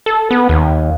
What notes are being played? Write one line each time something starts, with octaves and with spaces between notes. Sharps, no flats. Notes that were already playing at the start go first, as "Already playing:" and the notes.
A4
B3
D#2